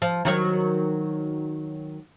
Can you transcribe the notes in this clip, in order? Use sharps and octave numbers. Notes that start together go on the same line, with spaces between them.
F3
D#3 F#3 C#5